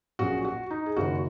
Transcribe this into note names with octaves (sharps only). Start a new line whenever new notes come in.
A#1 A#2 F#3 C#4 F#4 G#4
F#4
D#4
G#4
F#1 F#2 D#3 F#4